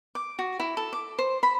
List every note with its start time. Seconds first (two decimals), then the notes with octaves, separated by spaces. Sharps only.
0.15 D6
0.39 F#4
0.60 E4
0.77 A4
0.93 D6
1.19 C5
1.43 B5